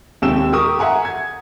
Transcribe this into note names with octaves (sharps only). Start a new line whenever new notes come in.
D#2 C3 G#3 G5 E6 E7
G4 A#4 C#6 D#6
E5 F#5 G#5 A#5
G#6